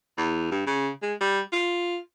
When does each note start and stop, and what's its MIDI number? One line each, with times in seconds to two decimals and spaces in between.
0.18 0.49 40
0.51 0.66 43
0.67 0.89 49
1.02 1.14 56
1.21 1.40 55
1.53 1.98 65